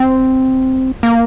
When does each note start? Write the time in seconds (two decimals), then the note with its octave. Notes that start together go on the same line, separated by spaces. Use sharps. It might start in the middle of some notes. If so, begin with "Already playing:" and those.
Already playing: C4
1.03 A#3